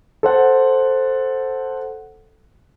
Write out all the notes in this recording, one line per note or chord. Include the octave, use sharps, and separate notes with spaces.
A4 C5 F#5